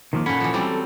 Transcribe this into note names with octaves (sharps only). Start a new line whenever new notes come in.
D#3 F3 A#3
A#2 C#4 A4 F#5 B5
E3 F3
F#3 G3 C4 A4